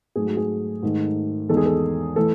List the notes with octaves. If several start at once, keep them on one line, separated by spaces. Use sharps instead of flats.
G#2 F#3 A3 G#4
F#4
G#4
G#2 D#3 A3
E2 D#3 G#3 A4
G#4
A4
E3 A3 A4